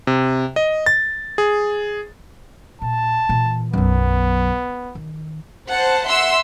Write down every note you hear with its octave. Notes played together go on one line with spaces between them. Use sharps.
C3
D#5
A6
G#4
A#2 A5
A#2 E3
B1 F#2 B3
D#3
C5 F#5 A5
E5 F#5 C6 E6